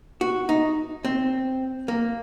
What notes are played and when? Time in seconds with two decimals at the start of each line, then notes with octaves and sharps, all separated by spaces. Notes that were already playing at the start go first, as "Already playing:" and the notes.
0.21 F#4
0.49 D#4
1.05 C4
1.88 A#3